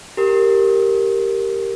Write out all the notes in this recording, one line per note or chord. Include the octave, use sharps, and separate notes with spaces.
G4 A#4